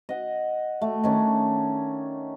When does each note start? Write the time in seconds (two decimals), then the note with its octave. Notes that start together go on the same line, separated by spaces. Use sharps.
0.09 D#5 F#5
0.81 A3
1.04 D#3 C#4 D4